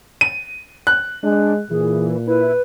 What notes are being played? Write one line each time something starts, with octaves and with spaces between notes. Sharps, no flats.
D#7
F#6
G#3 D4
A#2 E3 G#4
E4 B4